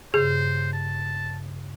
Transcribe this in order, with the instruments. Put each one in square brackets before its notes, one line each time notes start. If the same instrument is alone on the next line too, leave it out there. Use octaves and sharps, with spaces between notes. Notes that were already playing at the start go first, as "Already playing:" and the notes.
[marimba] G2 C#3 [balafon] G#4 [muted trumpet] C5
[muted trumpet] A5